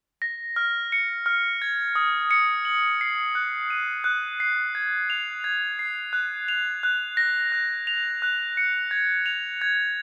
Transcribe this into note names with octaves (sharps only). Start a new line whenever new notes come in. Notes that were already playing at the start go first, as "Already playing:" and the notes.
A#6
F6
C#7
F6
G#6
D#6
C#7
F#7
C7
F#6
D#7
F#6
C7
G#6
F7
G#6
C7
F#6
F7
F#6
A#6
F#6
F7
F#6
C#7
G#6
F7
G#6